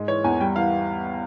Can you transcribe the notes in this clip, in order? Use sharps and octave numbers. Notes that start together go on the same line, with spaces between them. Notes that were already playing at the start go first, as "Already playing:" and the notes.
Already playing: G#2 G#3
E3 C#5
E2 G#5
G3 G5
E3 F5